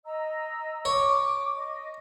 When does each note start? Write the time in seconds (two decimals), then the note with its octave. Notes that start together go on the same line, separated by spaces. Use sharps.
0.05 D#5 A#5 E6
0.85 C#5 D6
1.57 D#5